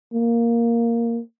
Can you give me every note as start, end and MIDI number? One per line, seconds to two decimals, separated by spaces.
0.14 1.20 58